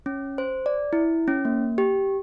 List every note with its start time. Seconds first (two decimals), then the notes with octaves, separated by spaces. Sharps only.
0.06 C#4
0.38 C5
0.66 D5
0.93 E4
1.28 C#4
1.45 A#3
1.78 G4